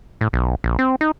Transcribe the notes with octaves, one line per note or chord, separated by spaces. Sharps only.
A2
B1
A#1
C4
D#4